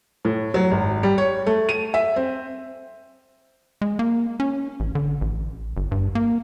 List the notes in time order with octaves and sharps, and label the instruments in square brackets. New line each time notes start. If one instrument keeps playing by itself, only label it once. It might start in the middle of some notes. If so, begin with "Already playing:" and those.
[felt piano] A2
F#3
G#1
G3
C#5
A3
D#7
E5
C4
[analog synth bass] G#3
A#3
C#4
A1
D3
A1
G1
G2
A#3